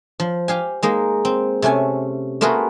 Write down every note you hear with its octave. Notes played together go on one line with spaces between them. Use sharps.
F3
G4 F5 G#5
G#3 A#3 D#4
C4
C3 A3 C#4 G#5
A3 A#3 F4 F#4 G#4 B4